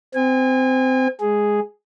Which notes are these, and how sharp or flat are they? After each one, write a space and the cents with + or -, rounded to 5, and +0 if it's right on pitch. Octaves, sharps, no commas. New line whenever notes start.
C4 -20 G#5 -35
G#3 +0 G#4 +0